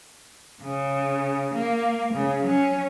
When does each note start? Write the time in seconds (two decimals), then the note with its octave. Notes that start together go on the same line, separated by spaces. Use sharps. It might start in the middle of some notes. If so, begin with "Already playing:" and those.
0.62 C#3
1.54 A#3
2.13 C#3
2.43 F#3 C#4